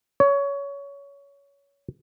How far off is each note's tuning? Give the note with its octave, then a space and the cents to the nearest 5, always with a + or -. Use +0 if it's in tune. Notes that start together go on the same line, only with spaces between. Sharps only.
C#5 +20